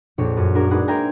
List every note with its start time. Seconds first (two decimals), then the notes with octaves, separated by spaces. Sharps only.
0.18 A#1 F2 D4 C#5
0.37 F#2
0.54 D4 F#4 G#4 A#4
0.71 G#3 D4 D#4 G#4 B4 F#5
0.88 A#4 C5 E5 G5 G#5 A#5